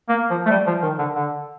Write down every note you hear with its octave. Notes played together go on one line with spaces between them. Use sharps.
A#3
F3
A3
G3
F3
D#3
D3
D3